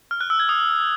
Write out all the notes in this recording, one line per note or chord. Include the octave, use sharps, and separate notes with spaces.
F6
F#6
E6
G#6
D#6